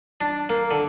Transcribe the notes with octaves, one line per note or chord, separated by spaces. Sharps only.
D4
A#3
D3